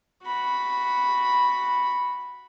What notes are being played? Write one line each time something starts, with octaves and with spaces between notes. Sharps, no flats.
F#4 B5